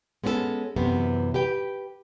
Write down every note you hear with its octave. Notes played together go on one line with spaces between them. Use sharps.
G#3 B3 C#4 F#4 A4
F#2 C3 E3 B3
G4 B4 G5